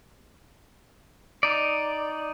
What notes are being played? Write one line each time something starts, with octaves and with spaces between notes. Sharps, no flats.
D#4 D5